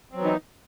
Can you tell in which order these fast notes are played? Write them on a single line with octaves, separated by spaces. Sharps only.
C4 F#3 B3 E3 D#4